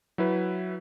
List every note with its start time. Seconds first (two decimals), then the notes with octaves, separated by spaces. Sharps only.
0.18 F#3 E4 B4